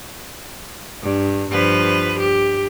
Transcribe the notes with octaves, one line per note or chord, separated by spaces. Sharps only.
G2
G2 F3 B4
G4